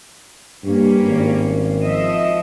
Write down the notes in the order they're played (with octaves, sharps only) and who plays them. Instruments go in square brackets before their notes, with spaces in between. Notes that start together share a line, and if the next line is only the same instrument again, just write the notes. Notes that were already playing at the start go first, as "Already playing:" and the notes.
[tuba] G2 [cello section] G3 A#3 C#4
[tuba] G#1
[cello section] F3 D#5 E5